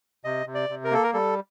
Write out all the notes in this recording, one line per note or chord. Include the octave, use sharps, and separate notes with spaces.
C3 D#5
C3
D5
C3
A#4
A#3 A4
A#4
G3 A4